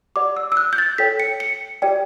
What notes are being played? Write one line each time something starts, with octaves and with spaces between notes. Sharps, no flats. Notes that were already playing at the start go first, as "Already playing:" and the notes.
G4 D5 F#5 D6
E6
E6
F#6
G6
A6
A4 C#5 G5 B6
C#7
C#7
G4 D5 G5